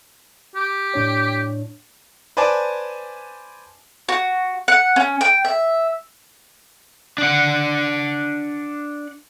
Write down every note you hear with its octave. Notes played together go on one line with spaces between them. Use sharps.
G4
A2 D4 C#5
B4 C5 D5 G#5 A5 D6
F#4
F#5
C#4
G5
E5
D4 F#5